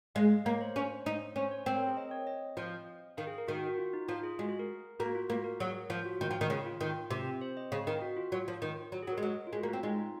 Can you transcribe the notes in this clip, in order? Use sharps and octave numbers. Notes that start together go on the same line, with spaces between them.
G#3 F5
D#5
A#3 C#5
C5
C#4
D#4
C#4 C5
C#5
C4 C5
A#4
G#4
D#5
C#5
D#5
F3
D#3 F5
G#4
A#4
D#3 F#4
F#4
F#4
F4
D#4
F3 F4
G#4
G#3 F#4
G#4
A#4
A#3 F#4
F4
A#3 F#4
A#4
F#3 G#4
F3 F4
F#4
D#3
F3
D#3
C#3 F4
F4
D#3
C3
C5
D#5
C#3 F5
D#3 D#5
F#4
F4
F#3
F3
D#3
F#3
G#4
F#3
A#4
G#3
F#3 D#5
F4
G#3 F#4
A#3
F4
C4
G#3 D#4
F4